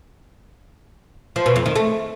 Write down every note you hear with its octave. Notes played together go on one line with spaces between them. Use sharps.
F3
B2
F2
D#3
A3